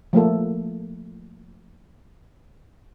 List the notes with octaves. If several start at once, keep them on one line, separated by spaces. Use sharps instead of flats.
F3 A3 A#3 A4